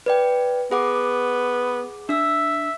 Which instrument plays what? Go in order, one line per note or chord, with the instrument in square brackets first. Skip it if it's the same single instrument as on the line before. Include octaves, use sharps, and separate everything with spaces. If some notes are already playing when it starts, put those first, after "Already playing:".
[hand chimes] B4 D5 G5
[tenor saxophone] B3 [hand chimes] G#4 F#5 D6
[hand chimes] D4 E6 [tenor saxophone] E5